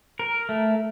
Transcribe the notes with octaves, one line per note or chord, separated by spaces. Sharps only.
A#4
A3